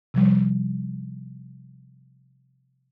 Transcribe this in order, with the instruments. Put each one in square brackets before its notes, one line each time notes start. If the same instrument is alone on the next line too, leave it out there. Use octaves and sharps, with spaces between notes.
[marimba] C3 F3 G3